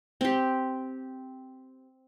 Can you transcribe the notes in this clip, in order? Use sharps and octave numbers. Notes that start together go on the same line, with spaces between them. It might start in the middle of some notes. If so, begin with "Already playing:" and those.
C4 G4